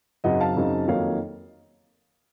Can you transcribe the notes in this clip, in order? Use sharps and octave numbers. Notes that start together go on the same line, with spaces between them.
F#2 C#3 F#3 C4 D#4 D#5 F#5
F5 A5
F#2 C#3 F#3 C4 D#4
F2 D#3 F#3 A#3 D#4 C#5 F5